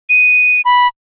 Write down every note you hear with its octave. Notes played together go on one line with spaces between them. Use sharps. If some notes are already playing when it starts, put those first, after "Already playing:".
D#7
B5